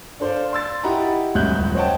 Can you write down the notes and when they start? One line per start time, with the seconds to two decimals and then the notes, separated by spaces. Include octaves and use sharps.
0.20 D4 A4 C5 D5 F5
0.53 C6 E6 A6
0.83 E4 G4 D#5 F#5 A#5 B5
1.35 D#1 C#2 F#2 E5 F#6 G6
1.75 C5 C#5 D#5 F#5 G5 A5